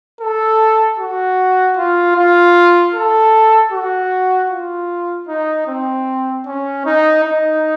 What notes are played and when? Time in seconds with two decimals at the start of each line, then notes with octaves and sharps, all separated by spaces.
0.21 A4
0.99 F#4
1.77 F4
2.16 F4
2.94 A4
3.73 F#4
4.50 F4
5.28 D#4
5.67 C4
6.46 C#4
6.85 D#4
7.24 D#4